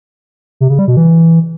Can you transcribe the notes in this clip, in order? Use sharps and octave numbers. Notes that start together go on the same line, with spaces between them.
C3
C#3
G3
B2
E3